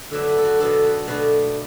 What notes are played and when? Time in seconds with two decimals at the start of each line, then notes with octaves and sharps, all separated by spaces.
0.11 D3 F#3 B3 D4 E5
0.28 B4
0.38 A4
0.45 F#4
0.60 B2 F#3 B3 D4 A4
0.85 B4
1.07 B2 A3 D4 B4